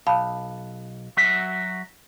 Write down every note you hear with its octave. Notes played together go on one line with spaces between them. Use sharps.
B1 F5 A5 B5
F#3 F#4 E5